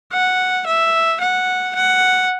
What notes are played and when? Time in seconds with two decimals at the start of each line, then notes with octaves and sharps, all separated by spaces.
0.12 F#5
0.66 E5
1.21 F#5
1.75 F#5